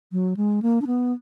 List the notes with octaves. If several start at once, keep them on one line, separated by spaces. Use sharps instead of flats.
F#3
G#3
A#3
D4
B3